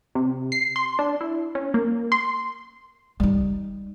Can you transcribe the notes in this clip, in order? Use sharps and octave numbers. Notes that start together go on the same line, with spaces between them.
C3
C7
C6
D4
E4
C#4
A#3
C6
G3 D#4